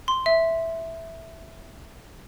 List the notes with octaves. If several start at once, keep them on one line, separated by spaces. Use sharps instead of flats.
C6
E5